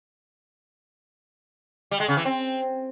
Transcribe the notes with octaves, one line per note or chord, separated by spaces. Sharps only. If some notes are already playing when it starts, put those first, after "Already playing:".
G3
G#3
C#3
E3
C4